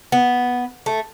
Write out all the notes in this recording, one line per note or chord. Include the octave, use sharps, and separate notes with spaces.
B3
A3